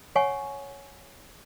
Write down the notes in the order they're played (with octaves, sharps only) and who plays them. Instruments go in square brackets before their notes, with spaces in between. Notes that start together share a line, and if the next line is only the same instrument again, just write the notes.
[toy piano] C#5 F#5 G#5 C#6